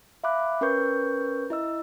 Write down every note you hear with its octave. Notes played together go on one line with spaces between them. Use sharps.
E5 F5 B5 D6 F#6
C#4 A#4 B4 C#6 G6
E4 D#5 E6